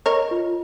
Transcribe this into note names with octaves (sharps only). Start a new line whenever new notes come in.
A#4 C#5 D#5
F4